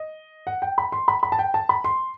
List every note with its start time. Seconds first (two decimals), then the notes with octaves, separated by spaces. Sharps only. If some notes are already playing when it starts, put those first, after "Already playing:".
Already playing: D#5
0.47 F#5
0.62 G5
0.78 B5
0.92 C6
1.08 B5
1.23 B5
1.32 A5
1.39 G5
1.54 A5
1.69 B5
1.84 C6